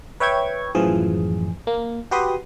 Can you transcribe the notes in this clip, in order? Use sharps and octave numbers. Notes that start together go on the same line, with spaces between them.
B4 C#5 E5 G5 C#6 G#6
F#2 A2 E3 F3 G#4
A#3
F#4 G4 B4 C6 D#6